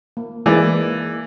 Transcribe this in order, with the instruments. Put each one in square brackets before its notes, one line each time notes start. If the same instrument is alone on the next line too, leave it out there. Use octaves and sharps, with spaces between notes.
[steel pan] A#3
[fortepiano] E3 [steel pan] G#3 A#3 D5